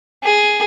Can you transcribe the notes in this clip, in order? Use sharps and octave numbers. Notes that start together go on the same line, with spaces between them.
G#4